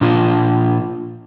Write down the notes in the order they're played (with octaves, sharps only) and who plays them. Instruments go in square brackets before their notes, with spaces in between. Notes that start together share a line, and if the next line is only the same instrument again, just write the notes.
[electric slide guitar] A#2 D4 F4